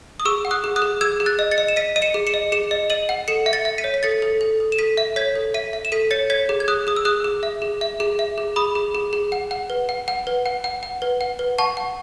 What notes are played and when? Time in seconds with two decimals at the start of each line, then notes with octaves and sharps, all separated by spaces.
0.20 D#6
0.25 G#4 C#6 E6
0.45 F#5
0.51 D#6 F#6
0.64 G#4
0.76 D#6 F#6
0.82 G#4
1.01 G#4 E6 G#6
1.20 G#4
1.26 F#6 A6
1.39 D#5
1.51 A6 C#7
1.58 D#5
1.68 E7
1.76 D#5 B6 D#7
1.96 D#5 D#7
2.02 C#7 E7
2.14 G#4
2.27 C#7 E7
2.34 D#5
2.52 G#4 C#7 E7
2.71 D#5
2.90 D#5 D#7 F#7
3.09 F#5
3.28 A4 C#7 E7
3.46 E5
3.53 A6 C#7
3.65 E5
3.78 B6 D#7
3.84 C#5
3.94 B6
4.03 A4 A6 C#7
4.22 A4
4.41 A4
4.60 A4
4.72 E7
4.78 A4 B6 D#7
4.97 E5
5.16 C#5 G#6 B6
5.35 A4
5.54 E5 B6 D#7
5.73 E5
5.85 E7
5.92 A4 B6 D#7
6.11 C#5 A6 C#7
6.30 C#5 G#6 B6
6.49 G#4
6.60 G#6
6.68 G#4 D#6 F#6
6.87 G#4 D#6
6.96 E6
7.05 G#4 D#6 F#6
7.24 G#4
7.43 E5
7.62 G#4
7.81 E5
8.00 G#4
8.19 E5
8.38 G#4
8.56 G#4 B5 D#6
8.75 G#4
8.95 G#4
9.13 G#4
9.32 F#5
9.51 F#5
9.70 B4
9.89 F#5
10.08 F#5
10.27 B4
10.46 F#5
10.64 F#5
10.83 F#5
11.02 B4
11.21 F#5
11.39 B4
11.58 F#5 A5 C#6
11.77 F#5